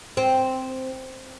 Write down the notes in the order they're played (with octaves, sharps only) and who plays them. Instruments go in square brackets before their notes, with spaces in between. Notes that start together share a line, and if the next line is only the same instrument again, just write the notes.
[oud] C4